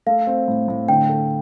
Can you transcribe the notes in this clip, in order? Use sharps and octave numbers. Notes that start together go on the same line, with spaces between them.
A3 F5
C4
A2
A2
D3 G5
A3